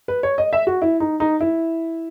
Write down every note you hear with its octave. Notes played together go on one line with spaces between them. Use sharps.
B4
C#5
D#5
E5
F#4
E4
D#4
D#4
E4